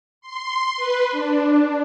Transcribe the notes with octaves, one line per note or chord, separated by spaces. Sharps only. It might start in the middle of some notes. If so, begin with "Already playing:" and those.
C6
B4
D4